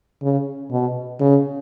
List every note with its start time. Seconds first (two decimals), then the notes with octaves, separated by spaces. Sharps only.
0.22 C#3
0.71 B2
1.20 C#3